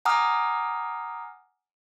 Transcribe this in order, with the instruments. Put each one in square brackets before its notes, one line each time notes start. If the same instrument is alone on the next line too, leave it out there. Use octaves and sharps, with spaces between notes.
[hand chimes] F#5 G#5 A#5 D6 D#6 F6